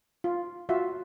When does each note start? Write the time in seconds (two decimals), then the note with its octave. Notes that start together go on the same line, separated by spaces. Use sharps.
0.24 F4
0.69 F4 F#4 E5